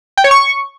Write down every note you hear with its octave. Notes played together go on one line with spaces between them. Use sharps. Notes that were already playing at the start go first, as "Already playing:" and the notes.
G5
C#5
C#6